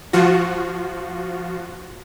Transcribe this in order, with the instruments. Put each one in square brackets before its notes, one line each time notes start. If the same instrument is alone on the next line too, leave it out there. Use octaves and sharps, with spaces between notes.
[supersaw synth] F3 F4 F#4